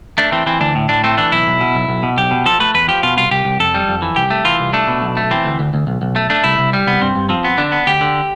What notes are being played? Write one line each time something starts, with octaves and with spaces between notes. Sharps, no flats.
A3 D4
E3 C4
E3 C4
D2 D4
A2
A2 D4
A3 C4
E3 D4
B1 E4
B1
B2
B1
B1
B2
B1 G4
B2
F3 A4
A3 B4
E2 B4
F3 G4
B2 F4
C2 F4
C2 G4
C2
F2 A4
G3
F2
E3
C2 G4
A3
E3 F4
C2
A3 D4
B2
B1
A3
E3 C4
D2
D2
D2
B1
B1
A3
A3 D4
C2 E4
C2
G3
C2 B3
G2 C4
G2
F3 C4
B3
D3 D4
B3
D2 G4
D3